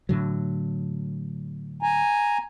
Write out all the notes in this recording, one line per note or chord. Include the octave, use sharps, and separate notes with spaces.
A2 D3 F#3
G#5 A#5